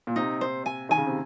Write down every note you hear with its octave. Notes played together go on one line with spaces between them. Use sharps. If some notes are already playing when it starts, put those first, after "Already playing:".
A#2
C3 D#4
C5
G#5
D#3 G#5
C#3
C3